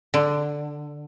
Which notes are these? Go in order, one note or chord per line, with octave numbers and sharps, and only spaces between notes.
D3